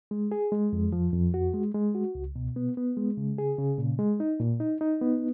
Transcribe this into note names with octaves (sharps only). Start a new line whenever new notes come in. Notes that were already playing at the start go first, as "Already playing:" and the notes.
G#3
G#4
G#3
F2
F3
F2
F#4
G#3
G#3
F#4
C#2
B2
B3
B3
G#3
C#3
G#4
C#3
A#2
G#3
D#4
A#2
D#4
D#4
B3